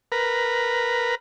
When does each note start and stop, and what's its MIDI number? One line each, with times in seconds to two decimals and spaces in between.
0.12 1.15 70
0.12 1.15 71